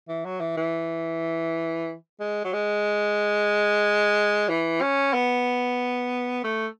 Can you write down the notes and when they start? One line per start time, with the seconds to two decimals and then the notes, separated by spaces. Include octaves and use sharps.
0.08 E3
0.25 F#3
0.40 E3
0.57 E3
2.20 G#3
2.44 F#3
2.53 G#3
4.49 E3
4.81 C#4
5.13 B3
6.44 A3